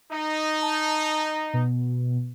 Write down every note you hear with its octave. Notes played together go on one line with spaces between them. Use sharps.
D#4
A5
B2